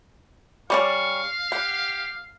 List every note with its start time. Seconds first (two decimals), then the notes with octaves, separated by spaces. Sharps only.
0.70 G3 C#4 D5 F5 C#6
1.52 G4 F#5